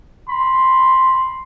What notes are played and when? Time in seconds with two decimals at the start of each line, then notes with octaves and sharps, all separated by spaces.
0.28 B5 C6